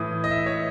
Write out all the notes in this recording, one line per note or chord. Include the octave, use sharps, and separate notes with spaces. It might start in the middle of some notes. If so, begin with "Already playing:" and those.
Already playing: A2 E3 D#6
D#5
E5
C#5